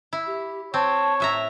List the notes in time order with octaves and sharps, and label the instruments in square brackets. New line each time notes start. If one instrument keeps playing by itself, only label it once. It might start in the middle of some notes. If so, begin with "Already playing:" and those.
[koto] E4
[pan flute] G4
[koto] C4 [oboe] C#5 [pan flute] A5
[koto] A2 E5 A#5